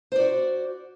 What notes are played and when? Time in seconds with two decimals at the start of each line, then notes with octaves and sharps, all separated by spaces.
0.12 C5
0.16 D5
0.20 F#4